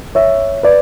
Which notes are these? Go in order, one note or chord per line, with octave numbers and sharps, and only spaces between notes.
C#5 E5
B4 D5